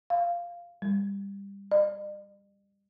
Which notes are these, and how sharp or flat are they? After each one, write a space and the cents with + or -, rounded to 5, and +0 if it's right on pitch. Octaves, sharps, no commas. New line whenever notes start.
F5 -5
G3 +20
D5 +45